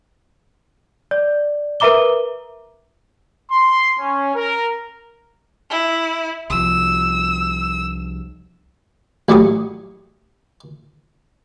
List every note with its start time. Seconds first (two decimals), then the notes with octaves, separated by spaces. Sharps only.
1.11 D5
1.80 A#4 B4 E5 A#5 D6 G7
3.51 C6
3.99 C#4
4.35 A#4
5.70 E4
6.50 C2 F3 E6
9.29 A1 F#3 G3 C#6 D#6